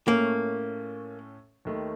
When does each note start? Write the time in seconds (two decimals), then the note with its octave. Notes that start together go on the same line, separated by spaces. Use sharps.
0.08 A2 A3 A#3 C#4
1.65 D#2 D#3 A3